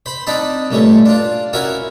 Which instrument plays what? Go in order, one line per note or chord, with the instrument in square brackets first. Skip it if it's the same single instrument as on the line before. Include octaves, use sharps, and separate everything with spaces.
[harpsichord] C5 B5
C4 D4 D#4 A5 B5
G2 A#2 A3 C#4
D4 F4
C#4 E4 F#4 A#4 C#5